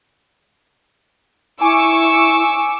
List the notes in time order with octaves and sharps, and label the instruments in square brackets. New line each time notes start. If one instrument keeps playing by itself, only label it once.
[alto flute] E4 [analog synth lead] G#5 [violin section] C#6 D6 E6